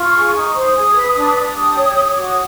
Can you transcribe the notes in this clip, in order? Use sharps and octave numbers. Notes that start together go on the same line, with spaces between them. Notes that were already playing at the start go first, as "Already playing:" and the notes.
Already playing: F4 C#6
G#4
D#4
C5 D#6
G#4
B4
D4
D4 D#6
G4
C#5
C#5
F#4 D6
D#6